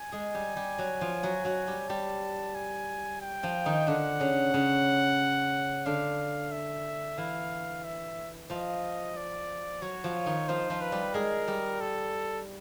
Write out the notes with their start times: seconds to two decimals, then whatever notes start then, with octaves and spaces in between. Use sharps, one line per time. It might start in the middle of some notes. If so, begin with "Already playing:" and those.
Already playing: G#5
0.12 G#3 G#4
0.34 G3 G4
0.56 G3 G4
0.78 F#3 F#4
1.01 F3 F4
1.23 F#3 F#4
1.45 F#3 F#4
1.67 G3 G4
1.89 G3 G4 A5
2.55 G#5
3.21 G5
3.43 F3 F4
3.65 D#3 D#4
3.87 D3 D4 F#5
4.20 C#3 C#4
4.54 C#3 C#4
5.86 D3 D4 F5
6.52 E5
7.18 E3 E4 F5
7.84 E5
8.50 F3 F4 D#5
9.17 D5
9.82 F#3 F#4 C#5
10.04 F3 F4
10.26 D#3 D#4
10.48 F3 F4 C5
10.70 F3 F4
10.81 B4
10.92 G3 G4
11.14 G#3 G#4 A#4
11.48 G3 G4
11.81 A4